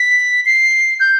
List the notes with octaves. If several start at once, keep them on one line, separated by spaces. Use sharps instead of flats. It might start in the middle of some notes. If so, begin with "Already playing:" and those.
Already playing: B6
C7
G6